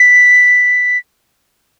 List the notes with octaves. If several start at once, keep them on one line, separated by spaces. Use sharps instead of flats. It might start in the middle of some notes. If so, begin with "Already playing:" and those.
Already playing: B6